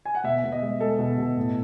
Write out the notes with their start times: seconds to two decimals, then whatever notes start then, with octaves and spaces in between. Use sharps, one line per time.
0.05 G#5
0.15 F#5
0.24 B2 E5
0.44 B2
0.52 D#5
0.62 G#3
0.80 G#3 A4
0.99 B2
1.18 B2
1.37 A2